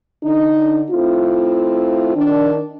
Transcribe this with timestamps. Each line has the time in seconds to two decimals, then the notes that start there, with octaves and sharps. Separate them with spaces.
0.23 D3 D4 D#4
0.91 A3 C4 E4 F4
2.15 D#3 D4